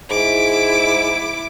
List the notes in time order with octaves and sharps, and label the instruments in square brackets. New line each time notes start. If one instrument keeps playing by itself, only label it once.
[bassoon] G#2 [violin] E4 D6